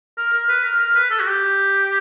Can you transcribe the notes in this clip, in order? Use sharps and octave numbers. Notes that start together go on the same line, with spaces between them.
A#4
A#4
B4
A#4
A#4
B4
A4
F#4
G4